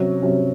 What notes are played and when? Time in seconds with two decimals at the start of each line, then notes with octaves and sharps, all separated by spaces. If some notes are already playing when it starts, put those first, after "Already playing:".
Already playing: C3 F#3 C#4
0.22 C3 F#3 C#4